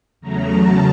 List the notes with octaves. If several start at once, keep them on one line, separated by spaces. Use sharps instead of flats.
E2 C#3 F#3 A3 A#5
A5